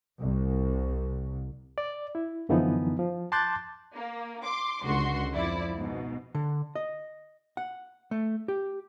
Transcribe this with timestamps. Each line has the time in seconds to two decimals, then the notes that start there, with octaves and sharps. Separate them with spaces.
0.19 C2
1.78 D5
2.15 E4
2.49 F#2 D3 E3 F3 B3 D#4
2.99 F3
3.32 A5 C6 D6 F#6 G6 A6
3.94 A#3
4.43 C6 D6
4.83 C#2 D3 F#4 C6
5.34 F2 F3 E4 D5
5.75 G#2 B2
6.35 D3
6.75 D#5
7.57 F#5
8.11 A3
8.48 G4